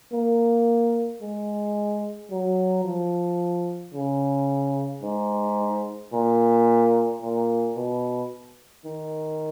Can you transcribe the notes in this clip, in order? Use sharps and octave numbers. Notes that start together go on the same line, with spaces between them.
A#3
G#3
F#3
F3
C#3
G#2
A#2
A#2
B2
D#3